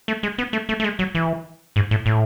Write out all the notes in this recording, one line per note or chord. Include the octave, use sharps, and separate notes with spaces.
A3
G#3
B3
A3
A3
A3
G#3
F#3
E3
G#2
A2
A2